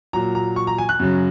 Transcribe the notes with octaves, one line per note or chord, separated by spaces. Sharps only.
A#2 F#3 A#5
A#5
C#6
A#5
G#5
F#6
F#2 C#3 F#3